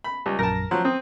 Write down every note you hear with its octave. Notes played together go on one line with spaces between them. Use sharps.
B5
C#2 G3
A#1 F#2 A#4 A5 A#6
F3 F#3 C5
C4 D#6